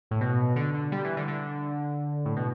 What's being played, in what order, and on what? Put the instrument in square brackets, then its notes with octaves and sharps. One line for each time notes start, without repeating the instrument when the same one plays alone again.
[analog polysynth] A2
B2
D3
D3
G3
E3
D3
D3
A2
B2